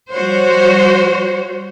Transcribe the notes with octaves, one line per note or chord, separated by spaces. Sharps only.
F3 G3 F#4 C5 C#5